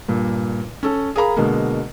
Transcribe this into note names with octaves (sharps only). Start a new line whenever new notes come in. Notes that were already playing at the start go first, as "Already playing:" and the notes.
G2 A#2
C#4 A4
G#4 A#4 F5 A#5 B5
B2 D3 G#3 A#3